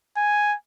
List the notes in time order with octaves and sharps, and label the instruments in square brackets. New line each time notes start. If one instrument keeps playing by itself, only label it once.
[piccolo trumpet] G#5